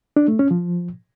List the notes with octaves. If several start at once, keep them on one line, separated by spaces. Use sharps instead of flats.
D4
A3
C#4
F3